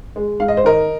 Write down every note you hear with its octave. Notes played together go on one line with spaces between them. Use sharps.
G#3
G#2 F5
D#5
C5
D#3 A#4 D#5